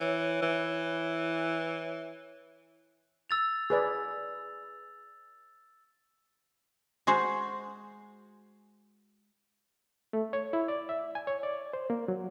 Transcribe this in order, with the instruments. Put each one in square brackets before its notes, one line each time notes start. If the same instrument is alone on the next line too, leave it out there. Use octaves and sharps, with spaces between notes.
[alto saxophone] E3 [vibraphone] C#5
[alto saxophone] E3
[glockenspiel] E6 A6 F7
[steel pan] G#4 B4 D5
[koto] G#3 F#4 C5
[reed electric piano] A3
C#5
E4
D5
E5
G#5
C#5
D5
C5
A#3
F#3